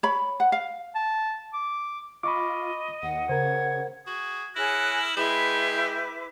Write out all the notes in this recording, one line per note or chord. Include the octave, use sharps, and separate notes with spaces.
C#5 B5
F#5
F5
A5
D6
F4 D#5 B5 C#6 D6
D#2 F#5
C#3 A#4 C5 G#6
F#4 G#4
E4 G#4 A#4 C#5 F#6
D#6 F6
G#3 E4 B4 G5 D6